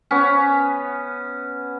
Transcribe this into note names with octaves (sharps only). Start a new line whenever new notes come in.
B3 C#4